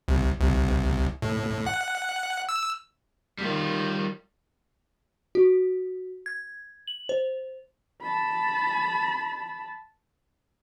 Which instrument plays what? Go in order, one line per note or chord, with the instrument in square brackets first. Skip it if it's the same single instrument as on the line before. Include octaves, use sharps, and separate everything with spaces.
[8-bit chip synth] C2
C2
A2
F#5
E6
[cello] D#3 [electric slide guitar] G3 F4
[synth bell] F#4
G#6
F#7
C5
[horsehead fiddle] A5 B5